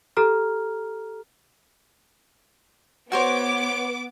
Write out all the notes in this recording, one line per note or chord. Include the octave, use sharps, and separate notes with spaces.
G4 A4 A#5 F6
B3 F#4 C5 C#5 D6